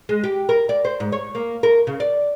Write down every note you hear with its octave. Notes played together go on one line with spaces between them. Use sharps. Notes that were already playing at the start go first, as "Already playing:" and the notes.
G#3
G4
A#4
D5
C5
G#2
C#5
A#3
A#4
C#3
D5